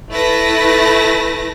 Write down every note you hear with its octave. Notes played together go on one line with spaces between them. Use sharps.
A3 E4 B4 A5 A#6